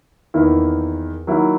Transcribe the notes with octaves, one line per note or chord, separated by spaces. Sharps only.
E2 D#3 A#3 E4
D#3 F#3 A#3 E4